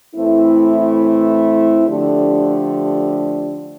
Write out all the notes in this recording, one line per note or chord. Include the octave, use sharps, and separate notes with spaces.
A2 E3 A3 C4 E4
D3 F3 A3 D4 G4